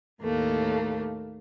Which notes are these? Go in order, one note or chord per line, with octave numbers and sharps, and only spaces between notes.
D#2 A2 A3 A#3